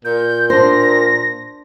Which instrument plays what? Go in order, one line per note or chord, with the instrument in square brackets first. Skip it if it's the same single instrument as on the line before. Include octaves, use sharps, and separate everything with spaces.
[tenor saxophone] A#2 [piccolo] G6
[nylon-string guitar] D4 C5 [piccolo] A#6